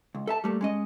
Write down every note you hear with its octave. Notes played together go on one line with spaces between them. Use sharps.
C#2
A4 E5 A5
G3 A3 A#3
G#3 C#4 D#5